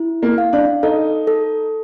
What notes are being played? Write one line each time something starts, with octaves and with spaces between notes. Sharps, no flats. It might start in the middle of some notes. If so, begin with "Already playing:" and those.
Already playing: E4
A#3
F5
D4
D#4 A4
A4